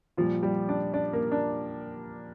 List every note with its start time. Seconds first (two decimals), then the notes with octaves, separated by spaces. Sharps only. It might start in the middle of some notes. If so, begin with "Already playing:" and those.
0.17 A#2 F3 G3 F4
0.43 G3 G4
0.69 D4 D5
0.93 D4 D5
1.13 A#3 A#4
1.32 D4